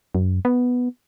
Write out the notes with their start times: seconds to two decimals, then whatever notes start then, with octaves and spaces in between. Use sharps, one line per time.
0.15 F#2
0.45 B3